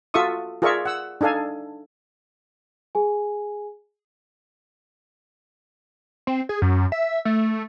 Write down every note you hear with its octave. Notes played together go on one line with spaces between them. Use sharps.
F4 F#4 A4 E5 C#6 D#6
F4 G#4 A#4 D5 E5 C#6
F#5 E6
D4 D#4 A4 F5 G#5
G#4 G#5
C4
G#4
F#2
E5
A3